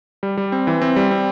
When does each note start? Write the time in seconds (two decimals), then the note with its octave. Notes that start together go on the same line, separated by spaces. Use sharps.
0.23 G3
0.37 G3
0.52 C4
0.67 E3
0.82 C4
0.96 G3
1.11 C4